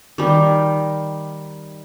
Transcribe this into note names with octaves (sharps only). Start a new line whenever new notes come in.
D#3 G3